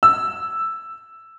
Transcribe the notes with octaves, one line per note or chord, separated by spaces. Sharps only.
E6